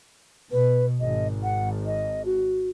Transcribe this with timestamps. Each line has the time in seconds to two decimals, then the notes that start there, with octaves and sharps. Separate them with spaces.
0.52 B2 B4
1.00 G#1 D#5
1.43 F#5
1.86 D#5
2.25 F#4